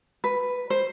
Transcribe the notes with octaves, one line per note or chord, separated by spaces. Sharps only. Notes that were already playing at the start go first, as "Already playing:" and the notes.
B4
C5